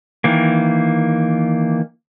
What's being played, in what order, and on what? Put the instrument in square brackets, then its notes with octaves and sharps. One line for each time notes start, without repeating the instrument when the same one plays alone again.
[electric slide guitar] D#3 E3 A#3